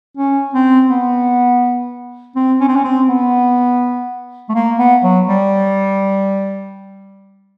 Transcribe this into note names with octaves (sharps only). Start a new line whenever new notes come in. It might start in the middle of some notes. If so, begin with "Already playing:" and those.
C#4
C4
B3
C4
C#4
C4
C#4
C4
B3
A3
A#3
B3
F#3
G3